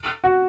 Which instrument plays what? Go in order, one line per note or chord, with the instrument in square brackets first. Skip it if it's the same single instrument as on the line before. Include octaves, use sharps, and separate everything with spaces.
[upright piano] F#4